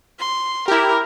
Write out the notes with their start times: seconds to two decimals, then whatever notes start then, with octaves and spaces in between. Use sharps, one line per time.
0.19 C6
0.68 E4 G4 A#4